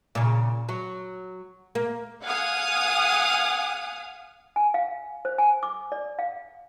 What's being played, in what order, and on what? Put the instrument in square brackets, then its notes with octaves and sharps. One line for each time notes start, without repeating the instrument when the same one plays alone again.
[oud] A#2 C#3
F#3
A#3
[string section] F5 F#5 G#5 D#6
[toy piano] G#5
F5
C5
G#5
D6
D5
F5